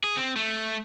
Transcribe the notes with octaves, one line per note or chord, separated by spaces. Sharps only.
G#4
C4
A3